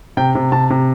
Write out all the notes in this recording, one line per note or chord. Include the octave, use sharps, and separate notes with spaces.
C3 G5
C3
C3 A5
C3